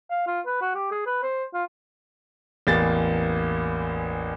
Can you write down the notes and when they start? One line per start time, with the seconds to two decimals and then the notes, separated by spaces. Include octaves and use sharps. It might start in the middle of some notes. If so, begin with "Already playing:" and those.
0.10 F5
0.27 F4
0.46 B4
0.61 F#4
0.75 G4
0.91 G#4
1.06 B4
1.23 C5
1.54 F4
2.67 A1 E2 A#3 A6